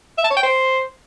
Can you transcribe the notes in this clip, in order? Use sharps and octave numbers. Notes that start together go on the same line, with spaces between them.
E5
A5
C#5
G5
C5